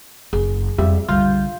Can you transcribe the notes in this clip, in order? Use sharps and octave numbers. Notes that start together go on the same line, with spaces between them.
F#1 G#4
F2 G3 B3 E5
B1 D3 G3 F4 G6